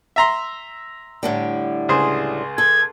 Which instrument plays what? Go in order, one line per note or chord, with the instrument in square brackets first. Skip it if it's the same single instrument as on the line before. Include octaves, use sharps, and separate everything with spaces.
[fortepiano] E5 A#5 C6
[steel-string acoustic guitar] A2 D3 G3
[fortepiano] C#2 G#4 C5
[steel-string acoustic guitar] A4 [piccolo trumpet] G#6